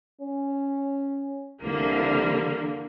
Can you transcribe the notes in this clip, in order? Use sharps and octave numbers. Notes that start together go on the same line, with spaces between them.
C#4
C2 D3 E3 A#3